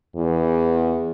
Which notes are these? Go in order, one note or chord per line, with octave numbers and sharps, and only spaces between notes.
E2